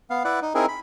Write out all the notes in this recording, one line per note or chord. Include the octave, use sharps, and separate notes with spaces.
B3 F5
E4 B4 D5 F#5
D#4
C4 D#4 E4 G#4 A#4
B5